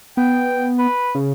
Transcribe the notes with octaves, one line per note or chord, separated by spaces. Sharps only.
B3 G5
B4
C#3